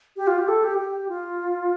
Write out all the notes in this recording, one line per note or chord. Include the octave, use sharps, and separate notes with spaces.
G4
F4
G4
A4
G4
G4
F4